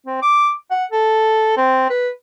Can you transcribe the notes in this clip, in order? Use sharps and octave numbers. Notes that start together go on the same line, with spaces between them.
C4
D6
F#5
A4
C4
B4